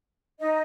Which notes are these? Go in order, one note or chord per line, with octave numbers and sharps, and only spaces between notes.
D#4 D#5